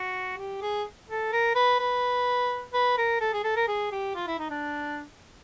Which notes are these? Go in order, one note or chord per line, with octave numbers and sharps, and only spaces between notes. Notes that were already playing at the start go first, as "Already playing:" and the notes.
Already playing: F#4
G4
G#4
A4
A#4
B4
B4
B4
A#4
A4
G#4
A4
A#4
G#4
G4
F4
E4
D#4
D4